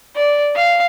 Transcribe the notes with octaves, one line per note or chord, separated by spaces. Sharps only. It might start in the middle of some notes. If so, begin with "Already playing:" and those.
D5
F5